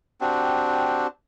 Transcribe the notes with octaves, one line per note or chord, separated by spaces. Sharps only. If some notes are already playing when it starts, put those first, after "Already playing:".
C4 D4 F#4 G4